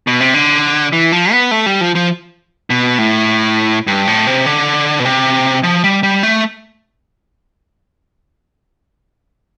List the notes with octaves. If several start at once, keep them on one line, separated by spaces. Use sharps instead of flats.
B2
C3
D3
E3
F3
B3
A3
G3
F3
F3
B2
A2
G2
A2
C3
D3
B2
C3
F3
G3
G3
A3